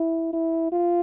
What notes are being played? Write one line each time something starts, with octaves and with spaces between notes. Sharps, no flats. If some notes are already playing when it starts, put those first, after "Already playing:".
Already playing: E4
E4
F4